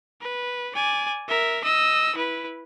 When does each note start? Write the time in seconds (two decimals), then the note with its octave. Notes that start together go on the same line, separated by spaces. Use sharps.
0.21 B4
0.75 D5 G#5
1.29 A#4 E5
1.64 D#5 E6
2.15 E4 B4